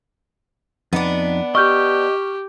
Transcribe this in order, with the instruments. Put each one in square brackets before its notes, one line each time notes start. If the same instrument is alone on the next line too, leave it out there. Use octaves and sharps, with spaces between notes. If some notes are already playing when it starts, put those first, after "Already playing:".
[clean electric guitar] F2 D#4 [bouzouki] B3 D4
[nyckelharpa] G4 [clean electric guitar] D#5 [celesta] C#6 F6 G6